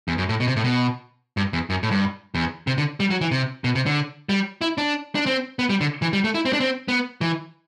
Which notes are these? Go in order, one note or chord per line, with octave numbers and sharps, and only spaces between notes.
E2
F#2
A2
B2
C3
A2
B2
G2
E2
F#2
A2
G2
E2
C3
D3
G3
F#3
E3
C3
B2
C3
D3
G3
E4
D4
D4
C4
B3
G3
D3
E3
G3
A3
E4
C4
D4
C4
B3
E3